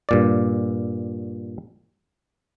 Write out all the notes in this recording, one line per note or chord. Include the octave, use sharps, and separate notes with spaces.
G2 A#2 D5